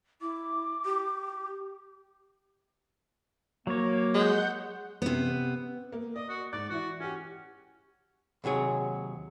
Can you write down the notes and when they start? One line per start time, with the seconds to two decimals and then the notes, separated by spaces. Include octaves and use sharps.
0.21 E4 D6
0.85 G4
3.67 F#3 A#3 C#5
4.14 G#3 F#5 G6
5.02 C3 B3
5.92 A#3
6.16 D5 D#5
6.29 F#4
6.52 G#2 D5 F#6
6.70 E3 E4 F#4
7.00 C#4 F#4 G4
8.44 D#2 C3 F#3 G#4 C#5